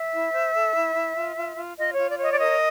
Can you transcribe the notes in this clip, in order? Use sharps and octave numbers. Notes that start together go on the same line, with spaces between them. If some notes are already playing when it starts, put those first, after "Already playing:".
Already playing: E5
E4
C5
A4
E4
E4
F4
F4
F4
F4 D#5
C#5
F4
D5
C#5
D#5
D5
A#4 D#5